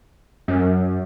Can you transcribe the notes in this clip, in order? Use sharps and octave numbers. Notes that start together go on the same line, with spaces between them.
F#2